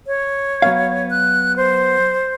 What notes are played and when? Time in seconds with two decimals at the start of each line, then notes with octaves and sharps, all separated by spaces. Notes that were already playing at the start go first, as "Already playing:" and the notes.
0.07 C#5
0.62 F#3 B3 F5
1.10 F#6
1.56 C5